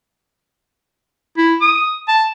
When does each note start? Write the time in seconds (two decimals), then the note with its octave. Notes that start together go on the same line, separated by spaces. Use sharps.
1.38 E4
1.61 D#6
2.08 A5